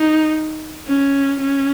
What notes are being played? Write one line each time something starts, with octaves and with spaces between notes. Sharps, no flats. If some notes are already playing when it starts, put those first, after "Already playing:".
Already playing: D#4
C#4
C#4